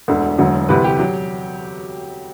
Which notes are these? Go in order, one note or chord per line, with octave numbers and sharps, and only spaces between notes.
E1 D2 D3
E1 D2 D3 F#3
D2 C3 E3 B4
G4
F#3